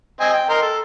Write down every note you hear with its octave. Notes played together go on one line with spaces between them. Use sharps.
C4 D#5 G#5
G5
A#4 D#5 C6
A4